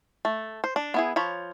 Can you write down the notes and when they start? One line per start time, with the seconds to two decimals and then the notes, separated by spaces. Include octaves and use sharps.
0.25 A3
0.64 C5
0.76 D4
0.94 B3 E4 G#4
1.16 F3 C#5 B5